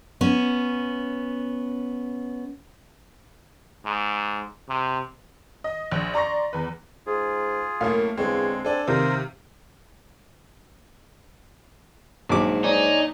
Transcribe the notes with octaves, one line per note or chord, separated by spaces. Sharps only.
B3 C#4
G#2
C3
D#5
A#1
D5 A#5 C6 C#6 A#6
E2 B4
G#2 F4 G#4
F#2 A2 A3 A#3 F5
E2 D3 G#3 C4 C#5
C4 D4 A4 G#5
C3 D#3 A#3 A#4 C5 F5
A#1 G#2 F#3 D6
D#4 C#5 D5 G#5